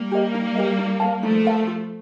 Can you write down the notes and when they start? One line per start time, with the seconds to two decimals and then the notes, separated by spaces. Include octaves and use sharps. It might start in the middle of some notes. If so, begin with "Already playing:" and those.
Already playing: G3 A#3
0.11 G4 A#4 D#5
0.34 D#4
0.55 G4 A#4 D#5
0.79 D#4
1.00 A#4 F5 A5
1.22 F3 A3 D#4
1.45 A#4 F5 A5
1.67 F4